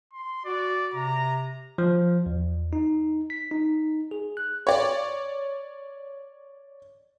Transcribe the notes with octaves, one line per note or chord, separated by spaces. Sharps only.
C6
F#4 D5
C3 A#5
F3
E2
D#4
B6
D#4
G#4
F#6
C#5 D5